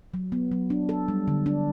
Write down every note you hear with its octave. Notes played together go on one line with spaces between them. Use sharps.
F#3
B3
F#3
D4
A4
G3
D3
D4